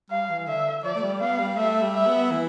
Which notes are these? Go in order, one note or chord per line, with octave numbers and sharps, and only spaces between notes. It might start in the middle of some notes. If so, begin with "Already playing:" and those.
G3 F5
E3
D3 E5
F3 D5
A3
G3
B3 F5
G3
A3 E5
G3
E5
B3
E3